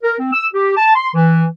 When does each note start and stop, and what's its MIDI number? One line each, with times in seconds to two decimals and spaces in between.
0.04 0.15 70
0.19 0.31 60
0.32 0.46 88
0.53 0.73 67
0.77 0.93 81
0.95 1.09 84
1.14 1.46 52